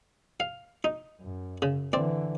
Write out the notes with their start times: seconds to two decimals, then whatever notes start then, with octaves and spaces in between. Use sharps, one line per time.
0.40 F5
0.84 D#4
1.21 F#2
1.62 C#3
1.93 D3 E3 C4 D5